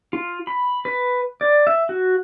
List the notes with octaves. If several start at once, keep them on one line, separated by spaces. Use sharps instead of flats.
F4
B5
B4
D5
E5
F#4